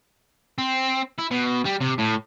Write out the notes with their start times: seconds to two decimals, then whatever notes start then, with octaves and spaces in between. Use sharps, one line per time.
0.58 C4
1.18 E4
1.31 B2
1.65 G3
1.81 C3
1.99 A2